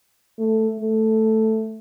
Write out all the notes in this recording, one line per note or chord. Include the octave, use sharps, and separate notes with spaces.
A3
A3